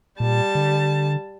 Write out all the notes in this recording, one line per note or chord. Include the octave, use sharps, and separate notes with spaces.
A#2 G3 A5
D3